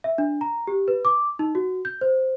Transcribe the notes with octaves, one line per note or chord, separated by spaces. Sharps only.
E5
D4
A#5
G4
B4
D6
D#4
F#4
G6
C5